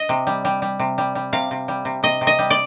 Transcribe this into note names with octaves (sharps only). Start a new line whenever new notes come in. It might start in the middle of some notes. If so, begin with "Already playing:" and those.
Already playing: D#5
C3
G3
G3
G3
C3
G3
G3
C3 F5
C3
G3
C3
C3 D#5
C3
D#5
G3
D5